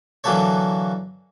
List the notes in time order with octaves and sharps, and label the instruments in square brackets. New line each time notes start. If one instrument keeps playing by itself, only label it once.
[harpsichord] D3 E3 F#3 A#3 A4 C#5